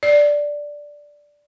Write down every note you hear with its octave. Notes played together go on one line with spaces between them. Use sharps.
D5